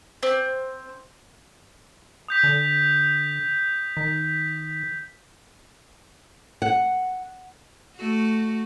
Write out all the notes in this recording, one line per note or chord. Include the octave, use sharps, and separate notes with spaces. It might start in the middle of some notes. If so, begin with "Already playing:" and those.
C4
D#6 G6 B6
D3
D#3 B6
F#5
A3 F#4